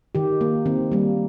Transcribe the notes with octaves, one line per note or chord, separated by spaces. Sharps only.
D#3 G4
A#3
D#3 C4
G3 A#3